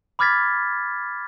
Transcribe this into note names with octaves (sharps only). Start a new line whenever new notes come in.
B5 D6 F6 G#6 A6 B6